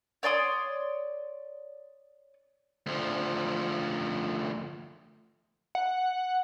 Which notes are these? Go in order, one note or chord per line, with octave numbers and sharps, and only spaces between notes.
C#5 D5 C6 D#6
D2 F3
F#5